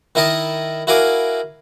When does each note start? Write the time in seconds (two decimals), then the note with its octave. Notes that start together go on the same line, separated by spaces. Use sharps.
0.15 D#3 E4 A#4 D#5 A5
0.87 E4 F#4 A#4 F5 G#5 D6